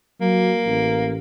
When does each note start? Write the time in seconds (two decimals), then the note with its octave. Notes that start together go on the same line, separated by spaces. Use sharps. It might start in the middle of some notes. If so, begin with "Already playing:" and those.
0.21 F#3 A#3
0.66 A1